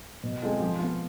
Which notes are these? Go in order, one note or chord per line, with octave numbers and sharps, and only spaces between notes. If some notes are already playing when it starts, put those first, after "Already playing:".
B2
G#3 C4 F4 A4
F3
B3 F4